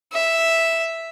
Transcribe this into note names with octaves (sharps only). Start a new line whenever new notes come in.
E5